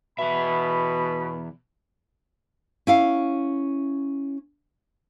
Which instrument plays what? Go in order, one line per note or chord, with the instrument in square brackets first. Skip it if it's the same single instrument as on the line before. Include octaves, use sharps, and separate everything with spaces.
[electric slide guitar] E2 E5 [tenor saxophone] B2 [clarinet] B5
[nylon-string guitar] C#4 E4 F5